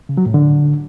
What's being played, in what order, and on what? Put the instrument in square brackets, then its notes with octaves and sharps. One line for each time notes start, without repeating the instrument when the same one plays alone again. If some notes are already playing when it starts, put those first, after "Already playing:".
[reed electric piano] C#3
F#3
A2
D3